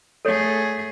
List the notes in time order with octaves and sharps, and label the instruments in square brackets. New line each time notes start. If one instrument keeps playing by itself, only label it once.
[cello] A3 G#4 [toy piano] A4 C#5